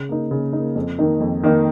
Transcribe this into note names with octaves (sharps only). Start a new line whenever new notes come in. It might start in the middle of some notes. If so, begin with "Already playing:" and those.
Already playing: C#3
A#3 D#4
C#3
A#3 D#4
F2
D#3 A#3 D#4
F2
D#3 A#3 D#4